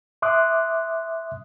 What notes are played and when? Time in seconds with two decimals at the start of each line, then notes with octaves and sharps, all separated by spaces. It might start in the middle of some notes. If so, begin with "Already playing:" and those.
0.22 E5 C6 D6 D#6 F#6